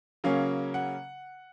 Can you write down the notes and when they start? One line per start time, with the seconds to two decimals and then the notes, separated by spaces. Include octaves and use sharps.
0.24 C#3 F#3 A#3 C#4 F5
0.74 F#5